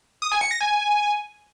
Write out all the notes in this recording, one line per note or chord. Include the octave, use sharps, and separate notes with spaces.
D#6
G#5
C#7
A#6
G#5